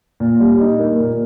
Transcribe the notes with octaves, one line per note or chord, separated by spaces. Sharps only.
A#2
G3
D#4
A#3
A#2